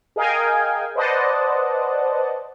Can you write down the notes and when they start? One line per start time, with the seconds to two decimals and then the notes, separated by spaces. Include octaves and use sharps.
0.16 G#4 A#4 D#5 F5 G5 G#5
0.95 B4 C5 D5 D#5 F#5 A5